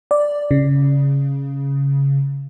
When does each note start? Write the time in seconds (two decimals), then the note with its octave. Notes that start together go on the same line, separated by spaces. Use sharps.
0.11 D5
0.51 C#3